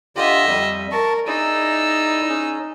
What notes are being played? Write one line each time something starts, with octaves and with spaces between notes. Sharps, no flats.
D3 F4 G4 D#5 E5
F2 G3
A#4 A5 C#6
D#4 E4 G#4 D5 E6
C#4 G#4